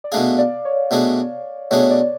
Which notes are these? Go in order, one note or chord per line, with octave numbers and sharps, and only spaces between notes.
D5
B2 A3 D4 G#4 F5
D5
C#5
B2 A3 D4 G#4
B2 A3 D4 G#4 C#5
D5